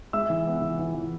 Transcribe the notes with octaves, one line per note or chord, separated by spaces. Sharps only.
G#3 E5 E6
E3
B3
E3
E3
E3